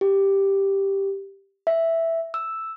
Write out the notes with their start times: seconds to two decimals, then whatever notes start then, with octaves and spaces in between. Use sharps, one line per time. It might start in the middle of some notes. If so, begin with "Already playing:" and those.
0.01 G4
1.67 E5
2.34 E6